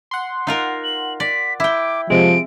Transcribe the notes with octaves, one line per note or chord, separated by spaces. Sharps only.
F#5 C6
D#4 F4 A#4
F#7
D5 B6
E4 G5 D6
C3 F3 G#3 D7